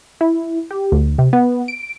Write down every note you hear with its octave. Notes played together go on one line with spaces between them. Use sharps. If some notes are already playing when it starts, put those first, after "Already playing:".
E4
G4
D2
C3
B3
D7